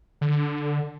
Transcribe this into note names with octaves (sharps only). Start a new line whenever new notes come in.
D3